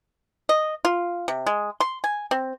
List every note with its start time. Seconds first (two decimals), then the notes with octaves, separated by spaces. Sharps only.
0.49 D#5
0.85 F4
1.28 C3
1.47 G#3
1.80 C6
2.04 G#5
2.31 C4